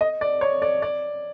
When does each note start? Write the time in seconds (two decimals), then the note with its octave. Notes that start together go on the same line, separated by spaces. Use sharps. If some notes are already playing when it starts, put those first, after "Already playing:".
0.01 D#5
0.21 D5
0.41 C#5
0.62 D5
0.82 D5